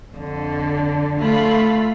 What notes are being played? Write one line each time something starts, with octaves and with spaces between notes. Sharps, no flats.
F2 D3
A3 F4 B5